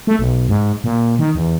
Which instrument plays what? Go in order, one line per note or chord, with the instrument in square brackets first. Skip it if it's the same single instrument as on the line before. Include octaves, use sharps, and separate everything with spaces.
[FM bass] A3
B1
G#2
A#2
D#3
E2